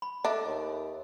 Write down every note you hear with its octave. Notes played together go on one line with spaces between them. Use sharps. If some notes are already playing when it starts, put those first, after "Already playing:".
B5
A3 D4 D#5 E5
D#2